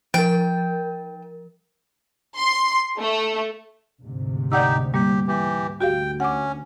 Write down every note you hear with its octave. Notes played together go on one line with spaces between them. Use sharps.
F3 A#4 G5
C6
A3
D2 G#2 C3
D#4 G4 D5 F#5 E6
G3 A#3 G4
E3 G4
D2 F#4 G4 F5 G5
C#4 F#5 D6